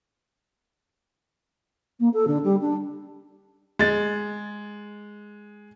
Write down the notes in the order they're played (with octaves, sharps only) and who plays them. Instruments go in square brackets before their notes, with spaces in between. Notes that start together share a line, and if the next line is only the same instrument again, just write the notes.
[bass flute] A#3
A4
D3
G3
D4
[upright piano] G#3 A6